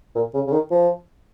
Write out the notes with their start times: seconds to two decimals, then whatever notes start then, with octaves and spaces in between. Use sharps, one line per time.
0.15 A#2
0.34 C#3
0.47 C#3
0.52 D#3
0.71 F3